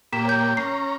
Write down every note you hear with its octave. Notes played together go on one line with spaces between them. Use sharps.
A#2 A#3 G4 B6 E7
C#5 G6
C#4 A#5 C7